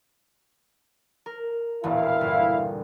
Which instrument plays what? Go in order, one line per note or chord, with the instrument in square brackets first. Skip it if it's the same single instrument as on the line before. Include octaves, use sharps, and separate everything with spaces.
[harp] A#4
[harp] E1 A1 A#2 [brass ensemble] E4 F5
[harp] G1